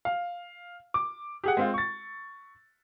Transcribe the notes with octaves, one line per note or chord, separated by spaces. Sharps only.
F5
D6
G4 G#4 F#5
G#3 C4 F4
C#6 A6